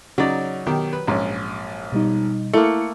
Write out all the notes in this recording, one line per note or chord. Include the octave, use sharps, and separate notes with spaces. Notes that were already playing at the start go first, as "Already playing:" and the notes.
C#3 F#3 D#4 D5
B2 D#3 G4
B4
A#1 G#2 C#4
B2 G3 D#4
A3 A#3 E4 C#7